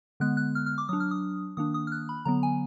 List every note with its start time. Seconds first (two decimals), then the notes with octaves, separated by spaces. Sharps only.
0.20 D3 G#3 B3 F#6
0.37 F#6
0.55 F6
0.66 F6
0.78 D6
0.89 F#3 D4 D#6
1.00 F6
1.11 D#6
1.57 D#3 A#3 D4 D#6
1.74 D#6
1.87 F6
1.92 F#6
2.09 B5
2.25 D3 F#3 B3 A#5
2.43 G#5